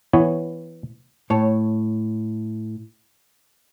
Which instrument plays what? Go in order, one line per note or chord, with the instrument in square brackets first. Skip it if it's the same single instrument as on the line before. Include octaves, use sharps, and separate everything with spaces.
[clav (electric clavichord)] E3 B3 C#5
[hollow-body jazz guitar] A2 C#5 A5